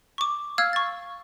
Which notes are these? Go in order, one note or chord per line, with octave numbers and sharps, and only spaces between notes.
C#6 D6
F5 E6 F6 G#6
C#6 A6